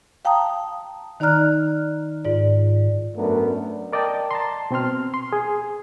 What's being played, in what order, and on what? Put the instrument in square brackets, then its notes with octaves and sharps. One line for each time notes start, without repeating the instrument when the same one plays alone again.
[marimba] F5 G5 A5 A#5 D#6
D#3 D#4 D5 A#5 F6 F#6
G#2 F4 D5
[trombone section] F#2 A3 B3 D4 A#4
[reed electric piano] A#4 D5 D#5 G5 A5
A5 A#5 C6
B2 C4 C5 C6 F6
C6
G#4